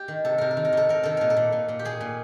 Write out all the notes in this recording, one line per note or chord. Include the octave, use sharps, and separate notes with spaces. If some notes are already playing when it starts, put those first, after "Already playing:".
Already playing: G4
D#3
C3 A4
C3 A#4
A4
D#3
A#4
C3 A4
C3 A#4
D#3 A4
A#2 A#4
A4
A#2
A#2
A#2
G4
A#2 G#4
A#2